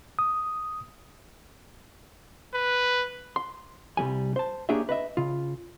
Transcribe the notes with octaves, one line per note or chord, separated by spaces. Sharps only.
D#6
B4
C6
C2 F3 G3 G#5
C5 A5
A#3 D4 G4 G#4 C#5 E5
B4 D#5 E5
C#3 F4